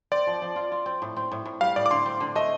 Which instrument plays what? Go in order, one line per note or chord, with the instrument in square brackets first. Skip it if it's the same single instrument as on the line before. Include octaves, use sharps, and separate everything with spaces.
[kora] C4 [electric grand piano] D5
[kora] F3
F3
F4
F4
C4
A2
C4
A2
A2
[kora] G3 [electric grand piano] F5
[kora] A2 [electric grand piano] D5
[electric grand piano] D6
[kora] D3 [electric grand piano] C6
[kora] C4
D3
[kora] A3 [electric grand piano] D#5